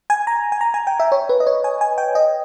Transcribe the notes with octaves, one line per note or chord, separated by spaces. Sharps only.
G#5
A#5
G#5
A#5
G#5
G5
E5
C#5
B4
D#5
C#5
G#5
G#5
G5
D#5